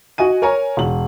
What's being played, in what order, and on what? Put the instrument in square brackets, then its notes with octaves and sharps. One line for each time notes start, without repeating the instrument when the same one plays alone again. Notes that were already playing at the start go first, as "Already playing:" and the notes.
[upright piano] F#4 D#5 G#5 D#7
A#4 C#5 G#5 A#5
E1 F#7